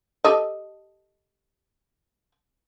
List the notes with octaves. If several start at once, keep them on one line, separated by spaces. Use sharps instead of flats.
G4 A4 D#5